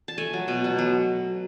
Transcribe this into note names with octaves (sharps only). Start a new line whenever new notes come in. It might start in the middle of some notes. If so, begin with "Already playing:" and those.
A5
A3 G#5
F#3
B2
B2
F#3